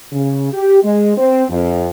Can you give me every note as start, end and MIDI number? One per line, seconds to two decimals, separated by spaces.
0.11 0.52 49
0.52 0.79 67
0.83 1.13 56
1.17 1.44 60
1.50 1.89 41